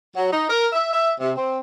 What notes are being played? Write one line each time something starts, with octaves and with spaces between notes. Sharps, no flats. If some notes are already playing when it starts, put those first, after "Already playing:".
F#3
D#4
A#4
E5
E5
C3
C4